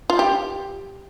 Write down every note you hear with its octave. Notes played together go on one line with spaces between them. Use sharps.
F4
G4